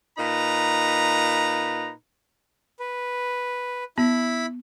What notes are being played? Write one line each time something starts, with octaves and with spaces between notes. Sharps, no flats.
A#2 D#4 B4 A#5
B4
B3 E4 B5